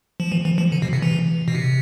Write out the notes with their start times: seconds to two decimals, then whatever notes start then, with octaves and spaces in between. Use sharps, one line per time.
0.20 F3
0.32 E3
0.45 E3
0.58 F3
0.72 D3
0.82 B2
0.93 C3
1.02 E3
1.48 B2
1.55 C3